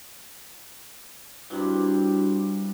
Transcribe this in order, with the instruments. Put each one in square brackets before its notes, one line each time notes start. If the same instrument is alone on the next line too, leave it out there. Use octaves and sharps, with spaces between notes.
[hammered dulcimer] G2 C3 G3 [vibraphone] D4 E4 F#4